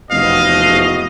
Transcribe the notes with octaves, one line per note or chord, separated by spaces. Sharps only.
F1 E2 G#2 B2 D#5 F5